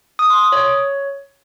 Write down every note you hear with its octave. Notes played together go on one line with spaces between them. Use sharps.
D#6
C6
D#6
C#5